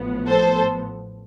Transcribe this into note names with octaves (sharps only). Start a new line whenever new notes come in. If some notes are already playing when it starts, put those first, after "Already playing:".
Already playing: A1 A2 F3 B3
A4 C5